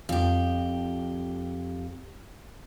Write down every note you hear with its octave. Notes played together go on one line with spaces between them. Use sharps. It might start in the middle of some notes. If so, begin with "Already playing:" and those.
F2 G4